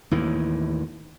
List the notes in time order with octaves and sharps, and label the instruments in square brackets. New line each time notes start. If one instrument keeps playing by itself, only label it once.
[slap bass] D#2 A2 E3